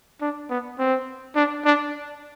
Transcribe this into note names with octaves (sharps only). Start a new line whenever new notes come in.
D4
B3
C4
D4
D4